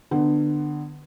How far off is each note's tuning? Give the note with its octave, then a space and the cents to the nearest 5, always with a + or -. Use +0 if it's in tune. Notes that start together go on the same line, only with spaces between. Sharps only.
D3 +25 B3 +10